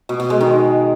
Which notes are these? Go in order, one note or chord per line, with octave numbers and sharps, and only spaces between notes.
B2
B2
G#3
D#3